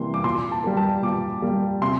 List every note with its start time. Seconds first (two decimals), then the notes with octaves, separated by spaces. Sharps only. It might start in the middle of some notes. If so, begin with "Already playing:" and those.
Already playing: C3 E3 G3 A#3 C6
0.14 D6
0.24 A#2 C6
0.51 A5
0.64 G3 A#3
0.77 A5
1.02 A#2 D6
1.42 G3 A#3
1.82 C3 C6